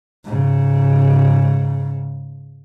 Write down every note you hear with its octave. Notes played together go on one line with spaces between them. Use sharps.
G#2 C#3